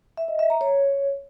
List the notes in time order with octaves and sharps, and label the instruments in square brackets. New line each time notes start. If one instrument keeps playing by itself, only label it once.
[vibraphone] E5
D#5
E5
A#5
C#5